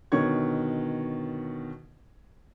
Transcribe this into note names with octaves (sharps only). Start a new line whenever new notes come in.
B2 D3 D#3 C#5 C#6 G#6